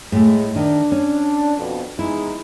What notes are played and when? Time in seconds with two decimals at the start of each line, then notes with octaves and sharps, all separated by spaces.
0.12 A2 G#3 A3 E4
0.56 D#3 D4 D#4
0.92 C#4
1.58 F2 B2
1.99 E2 G#3 D#4 E4